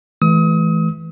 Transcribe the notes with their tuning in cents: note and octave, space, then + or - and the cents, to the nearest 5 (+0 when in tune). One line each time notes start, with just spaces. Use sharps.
E3 +0 A3 -30 D#6 +35